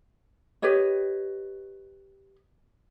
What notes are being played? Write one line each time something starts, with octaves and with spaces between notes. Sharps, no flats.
G4 B4 C#5 D#5